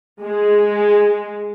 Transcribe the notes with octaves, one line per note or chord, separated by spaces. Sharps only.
G#3